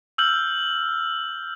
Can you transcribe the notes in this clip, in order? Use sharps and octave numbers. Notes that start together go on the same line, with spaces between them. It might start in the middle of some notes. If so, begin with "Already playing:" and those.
E6 F6 G6 F#7